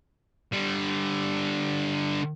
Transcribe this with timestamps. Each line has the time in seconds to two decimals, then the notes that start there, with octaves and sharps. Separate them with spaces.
0.52 D3 G3